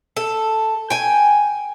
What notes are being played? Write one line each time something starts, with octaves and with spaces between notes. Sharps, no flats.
A4
G5 G#5